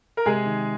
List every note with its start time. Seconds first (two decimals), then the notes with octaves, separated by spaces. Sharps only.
0.17 A#4
0.26 C3 G#3 G#4
0.46 D#3